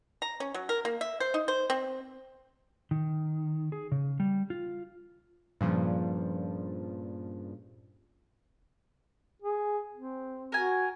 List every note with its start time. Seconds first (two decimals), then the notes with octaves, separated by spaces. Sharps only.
0.22 A#5
0.40 C#4
0.54 F#3
0.69 A#4
0.85 A#3
1.01 E5
1.20 C5
1.34 D#4
1.48 C5
1.70 C4
2.91 D#3
3.72 G#4
3.92 C#3
4.20 G3
4.50 F4
5.61 G2 A#2 C#3 F3
9.42 G#4
9.94 C4
10.52 F#4 A#4 G#5